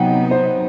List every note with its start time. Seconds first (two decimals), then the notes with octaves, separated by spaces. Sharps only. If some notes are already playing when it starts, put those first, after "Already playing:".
Already playing: C3 F#3 B3 D#4 F#5 G5
0.31 C5